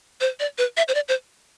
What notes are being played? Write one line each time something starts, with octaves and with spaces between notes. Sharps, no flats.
C5
D5
B4
E5
C5
D5
C5